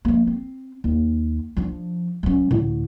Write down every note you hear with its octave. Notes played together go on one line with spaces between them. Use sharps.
F3 A#3
C4
D#2
F3 D4
F#3 C#4
D2 A2